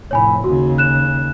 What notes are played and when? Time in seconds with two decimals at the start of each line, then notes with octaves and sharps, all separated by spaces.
0.11 F1 A2 C#5 G#5 B5
0.44 D#2 C#3 F#4
0.78 F#6 E7